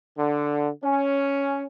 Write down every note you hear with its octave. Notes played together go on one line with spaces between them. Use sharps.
D3
C#4